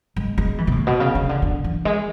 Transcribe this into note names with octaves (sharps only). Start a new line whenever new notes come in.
G#3
G#3
E3
B2
A2
B2
C#3
C#3
D3
D3
E3
G#3